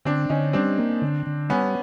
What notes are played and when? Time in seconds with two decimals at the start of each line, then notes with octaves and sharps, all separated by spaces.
0.05 D3 C4 D4
0.30 D3 C#4 D#4
0.53 G3 C4 D4
0.79 A#3
1.02 D3
1.27 D3
1.49 G3 B3 C#4